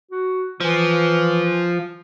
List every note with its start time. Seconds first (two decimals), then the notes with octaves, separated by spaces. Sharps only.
0.11 F#4
0.61 E3 F3